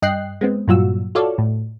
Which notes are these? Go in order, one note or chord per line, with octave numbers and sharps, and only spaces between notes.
G2 D#5 G5 F#6 C7
G#3 B3 C4
G2 A#2 F#3 F4 F#4 E6
F4 F#4 A4 C#5 D5 F5
A2